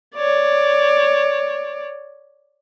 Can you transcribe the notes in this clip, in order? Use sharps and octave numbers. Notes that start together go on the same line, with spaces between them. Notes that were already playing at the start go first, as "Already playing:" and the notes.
C#5 D5